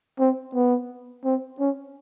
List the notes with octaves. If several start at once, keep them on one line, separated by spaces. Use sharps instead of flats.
C4
B3
C4
C#4